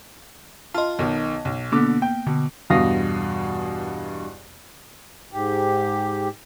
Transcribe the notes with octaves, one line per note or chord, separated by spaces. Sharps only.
F4 D#5 A5 C6
B1 B2 D#3
B1
B2 D3 A#3 B3 D6
G5
B2 D3
E2 G2 B2 F5 D#6 A#6
G#2 G4